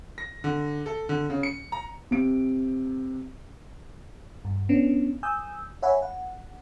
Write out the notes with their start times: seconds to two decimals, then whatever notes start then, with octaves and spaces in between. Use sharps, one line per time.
0.18 A#6
0.44 D3
0.86 A4
1.09 D3
1.30 C#3
1.43 C#7
1.72 A#5
2.11 C3 D7
4.45 G2
4.69 B3 C#4 D4
5.23 G#5 D#6 E6 G6
5.82 C#5 E5 F#5 G#5 B5
6.02 F#5